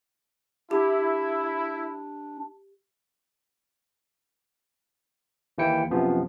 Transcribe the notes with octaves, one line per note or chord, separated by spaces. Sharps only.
D4 E4 G4
D#2 E3 A#3 E4 G5 C#7
F#2 C3 F3 B3